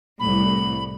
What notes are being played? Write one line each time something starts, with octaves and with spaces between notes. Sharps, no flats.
C2 A2 B5